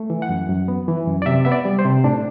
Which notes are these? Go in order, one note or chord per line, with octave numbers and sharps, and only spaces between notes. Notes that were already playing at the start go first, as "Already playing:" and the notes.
Already playing: A3
E3
F#5
F#2
F#2
B3
E3
F#2
D5
C3 E5
B3 E5
D5
G3
C5
C3
A2 D4